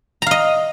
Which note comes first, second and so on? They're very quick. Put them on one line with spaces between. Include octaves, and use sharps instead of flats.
A#5 F5 D#5